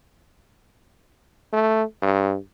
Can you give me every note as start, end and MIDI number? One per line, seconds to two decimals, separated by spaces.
1.53 1.84 57
2.02 2.36 43